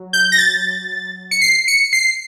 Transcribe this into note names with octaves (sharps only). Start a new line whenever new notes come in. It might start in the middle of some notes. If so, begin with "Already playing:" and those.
Already playing: F#3
G6
A#6
A6
C#7
C7
C#7
C7